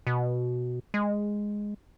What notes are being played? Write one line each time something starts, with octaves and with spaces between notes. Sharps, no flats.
B2
G#3